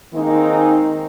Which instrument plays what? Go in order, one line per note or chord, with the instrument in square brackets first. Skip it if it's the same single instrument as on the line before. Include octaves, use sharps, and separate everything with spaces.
[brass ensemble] D#3 C4 [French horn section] G#3 A#3 D#4